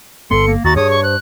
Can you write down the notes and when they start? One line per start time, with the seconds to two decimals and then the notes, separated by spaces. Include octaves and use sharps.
0.31 G1 B3 A4 C6 C#7
0.47 A#3
0.65 D#2 F#4 A#5 A6
0.76 G2 G#4 C#5 D#6
0.91 C#6
1.03 C5 F#6